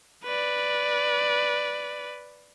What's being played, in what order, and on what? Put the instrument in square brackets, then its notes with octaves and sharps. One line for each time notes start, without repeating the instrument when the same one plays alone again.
[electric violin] B4 D5